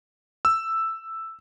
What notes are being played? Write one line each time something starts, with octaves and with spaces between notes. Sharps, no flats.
E6